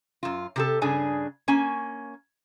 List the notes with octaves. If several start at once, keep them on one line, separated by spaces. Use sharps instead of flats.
F#2 F4
C3 G4 A4
G2 C#3 D4 G#4 G#5
A#3 C#4 G#5